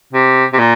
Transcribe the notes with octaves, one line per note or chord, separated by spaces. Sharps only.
C3
C3
A#2